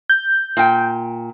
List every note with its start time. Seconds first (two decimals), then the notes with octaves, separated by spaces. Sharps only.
0.10 G6
0.57 A#2 G5